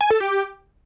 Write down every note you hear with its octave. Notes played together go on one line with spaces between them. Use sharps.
G#5
A4
G4